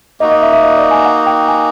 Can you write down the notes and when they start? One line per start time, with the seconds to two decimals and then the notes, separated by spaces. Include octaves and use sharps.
0.20 A#3 D#4 F#4 D#5
0.31 D#5
0.42 E5
0.52 E5
0.63 D#5
0.77 D5
0.91 G#5
1.05 F#5
1.26 G5
1.48 G#5